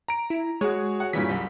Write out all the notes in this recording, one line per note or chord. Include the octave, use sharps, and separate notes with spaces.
A#5 D7
E4
G#3 F#4 G#4 C#5
F#5
G2 A#2 E3 B6
C2 F#2